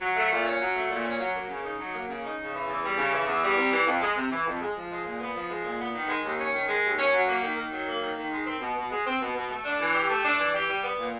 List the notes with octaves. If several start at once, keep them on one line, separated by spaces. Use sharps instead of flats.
F#3
A3
A#2
C#4
F#3
A3
A#2
C#4
F#3
A#3
C#3
D#4
F#3
A#3
C#3
D#4
C#3
E3
E2
G3
C#3
E3
E2
G3
C3
E3
F2
G#3
C3
E3
F2
G#3
F3
G#3
A#2
B3
F3
G#3
A#2
B3
D#3
G#3
D#2
C#4
D#3
G#3
D#2
C#4
F#3
A#3
D#3
D#3
F#3
A#3
D#3
D#3
G#3
C4
B2
B2
G#3
C4
B2
B2
A3
D4
E3
G4
A3
D4
E3
G4
G3
B3
A#2